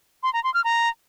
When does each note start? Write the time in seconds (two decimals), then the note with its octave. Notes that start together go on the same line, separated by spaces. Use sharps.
0.23 C6
0.33 A#5
0.44 C6
0.54 F6
0.64 A#5